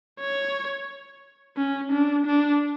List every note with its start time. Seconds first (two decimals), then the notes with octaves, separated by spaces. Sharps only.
0.20 C#5
1.57 C#4
1.93 D4
2.26 D4